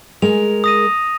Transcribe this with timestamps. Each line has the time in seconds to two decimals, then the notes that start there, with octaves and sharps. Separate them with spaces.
0.22 G#3 A#4 F7
0.64 D#6 A#6 D#7